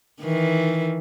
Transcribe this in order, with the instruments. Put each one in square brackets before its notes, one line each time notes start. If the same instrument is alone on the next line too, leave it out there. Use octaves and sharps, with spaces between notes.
[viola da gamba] D#3 E3